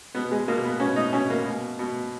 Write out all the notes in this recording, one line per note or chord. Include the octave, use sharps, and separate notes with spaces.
B2 B3
G#3
B2 A#3
B3
B2 C#4
D#4
B2 C#4
A#3
B2
B2